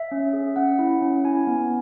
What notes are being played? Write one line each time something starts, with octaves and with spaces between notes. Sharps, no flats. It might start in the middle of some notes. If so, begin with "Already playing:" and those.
Already playing: E5
C#4
G#4
C#4 F#5
E4
C#4
E4 G#5
B3